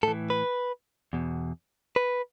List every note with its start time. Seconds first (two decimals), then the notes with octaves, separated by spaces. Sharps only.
0.03 A2 E3 A4
0.30 B4
1.13 E2 B2
1.96 B4